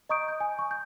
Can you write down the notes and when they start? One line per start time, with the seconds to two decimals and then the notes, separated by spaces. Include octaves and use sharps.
0.09 D#5 A#5 C#6 D#6 G6 D7
0.28 G6
0.40 G#5
0.59 C#6
0.71 G6